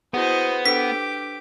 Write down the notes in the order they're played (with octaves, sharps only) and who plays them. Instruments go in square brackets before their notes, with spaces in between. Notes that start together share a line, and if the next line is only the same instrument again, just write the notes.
[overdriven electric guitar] B3 [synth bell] E4 F#4 G#4 [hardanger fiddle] C5 D#5
[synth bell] D4 A4 B4 [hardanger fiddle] G4 D6 [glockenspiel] B6